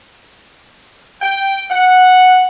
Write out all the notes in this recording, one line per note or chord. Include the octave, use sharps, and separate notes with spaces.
G5
F#5